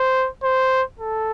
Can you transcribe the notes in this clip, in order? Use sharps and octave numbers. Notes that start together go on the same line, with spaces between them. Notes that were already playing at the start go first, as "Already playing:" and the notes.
Already playing: C5
C5
A4